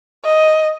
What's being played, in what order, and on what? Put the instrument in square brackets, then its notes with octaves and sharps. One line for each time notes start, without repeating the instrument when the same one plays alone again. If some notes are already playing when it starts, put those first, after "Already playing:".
[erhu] D#5